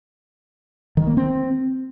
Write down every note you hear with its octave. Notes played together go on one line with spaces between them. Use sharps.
D#3
A#3
C4